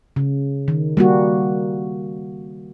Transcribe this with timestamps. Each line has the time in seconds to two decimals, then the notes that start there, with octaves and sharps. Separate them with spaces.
0.16 C#3
0.68 D#3
0.97 G3 A#3 F#4